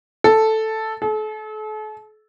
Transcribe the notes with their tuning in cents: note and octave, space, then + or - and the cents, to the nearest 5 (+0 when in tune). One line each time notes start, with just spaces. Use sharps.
A4 +0
A4 -40